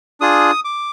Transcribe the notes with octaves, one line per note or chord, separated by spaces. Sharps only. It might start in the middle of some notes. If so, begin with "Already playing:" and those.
D4 F4 G#4 D#6
D6